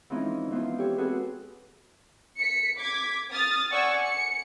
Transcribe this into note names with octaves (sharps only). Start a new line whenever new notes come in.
E3 F3 G#3 C4 C#4 D#4
E3 F3 B3 C#4 C5
G4 A4 C#5
C4 F#4 G#4 A4 B4 C5
B6 C#7
D6 G#6 B6
D#6 F6 A6
D5 F#5 G#5 C#6 E6
C#7